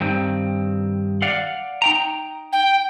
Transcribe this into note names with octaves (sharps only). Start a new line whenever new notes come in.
G2 D#3 C4
D5 F5 F#5
D#4 G5 A#5
G5